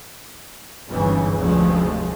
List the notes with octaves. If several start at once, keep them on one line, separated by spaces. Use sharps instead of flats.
G1 C#2 G#2 C#3 E3 C#4
F1 D2 F3 G#3 A3